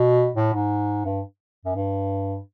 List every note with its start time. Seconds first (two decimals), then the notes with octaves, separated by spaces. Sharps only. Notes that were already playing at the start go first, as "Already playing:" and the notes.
Already playing: B2
0.37 A2
0.54 G#2
1.05 G2
1.65 F#2
1.75 G2